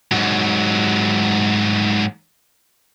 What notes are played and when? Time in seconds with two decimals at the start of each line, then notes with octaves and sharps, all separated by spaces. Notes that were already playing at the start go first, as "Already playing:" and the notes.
0.12 G#2 F#3